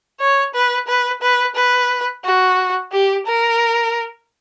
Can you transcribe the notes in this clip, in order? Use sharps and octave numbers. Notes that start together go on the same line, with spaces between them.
C#5
B4
B4
B4
B4
F#4
G4
A#4